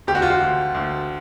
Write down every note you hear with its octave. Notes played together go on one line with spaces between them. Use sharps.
D2 G4
F#4
F4
F#4
D2
D2